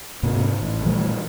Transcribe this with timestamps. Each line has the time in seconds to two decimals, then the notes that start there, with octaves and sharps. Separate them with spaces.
0.23 D2 G#2 C3 B3
0.61 A1
0.85 A#2 E3 G3 A3